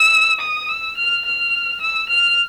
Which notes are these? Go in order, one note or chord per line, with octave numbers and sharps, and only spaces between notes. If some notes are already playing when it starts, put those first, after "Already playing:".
Already playing: E6
D#6
E6
F6
F6
E6
F6